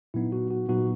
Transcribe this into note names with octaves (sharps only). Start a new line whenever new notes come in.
A#2 F#3 B3 D#4 E4
F#4
F#4
A#2 F#3 B3 D#4 F#4